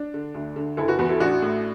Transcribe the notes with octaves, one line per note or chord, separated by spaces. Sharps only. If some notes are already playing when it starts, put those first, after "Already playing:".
Already playing: D4
D3
D2
D3
F#1 E4 A4
F#4 B4
E2 F#4 B4
E4 A4
A1 D4 F#4
A2